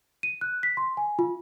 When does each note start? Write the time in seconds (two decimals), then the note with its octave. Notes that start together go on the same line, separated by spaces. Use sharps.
0.23 D#7
0.41 F#6
0.63 B6
0.77 C6
0.97 G#5
1.19 F4